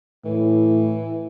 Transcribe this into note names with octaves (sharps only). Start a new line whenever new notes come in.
A2 E3